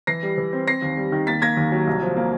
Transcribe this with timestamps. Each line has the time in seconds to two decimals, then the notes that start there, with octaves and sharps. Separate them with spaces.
0.07 E3 A#6 C7
0.23 G3
0.38 E3
0.53 C4
0.67 C4 A#6 C7
0.82 D#2
0.97 G3
1.12 D#3
1.27 A#3 A6 B6
1.42 A#3 G#6 A#6
1.57 D#2
1.72 F#3
1.87 C2
2.02 F3
2.17 A#3